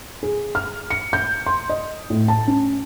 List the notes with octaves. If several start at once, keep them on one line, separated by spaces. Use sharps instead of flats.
G#4
F6
C#7
G6
C6
D#5
A2
A5
C#4